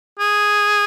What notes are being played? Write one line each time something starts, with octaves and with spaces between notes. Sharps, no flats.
G#4